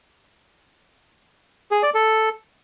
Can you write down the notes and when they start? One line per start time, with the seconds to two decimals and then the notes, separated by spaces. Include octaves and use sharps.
1.71 G#4
1.83 D5
1.94 A4